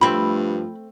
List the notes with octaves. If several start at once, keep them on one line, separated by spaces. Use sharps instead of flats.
G2 F3 A3 C4 B5